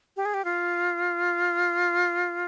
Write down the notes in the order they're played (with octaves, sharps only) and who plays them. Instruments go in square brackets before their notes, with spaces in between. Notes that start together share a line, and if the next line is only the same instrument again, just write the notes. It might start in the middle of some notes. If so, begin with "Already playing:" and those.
[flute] G4
G#4
G4
F4